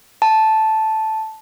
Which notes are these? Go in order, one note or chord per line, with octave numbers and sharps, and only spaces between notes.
A5